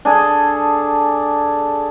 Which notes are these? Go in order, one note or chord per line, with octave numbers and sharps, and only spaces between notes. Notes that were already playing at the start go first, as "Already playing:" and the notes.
D4 G#4 A4